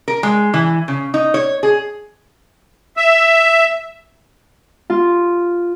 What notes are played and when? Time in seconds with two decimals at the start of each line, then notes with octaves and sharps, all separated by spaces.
0.08 A#4
0.23 G#3
0.54 E3
0.88 C#3
1.14 D#4
1.34 C#5
1.63 G#4
2.97 E5
4.90 F4